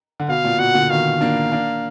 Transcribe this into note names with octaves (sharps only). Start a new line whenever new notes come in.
D3
B2 F5
A#2
B2 F#5
A#2 D3
B2 D#3 F5
A#3 D4
A#3 D4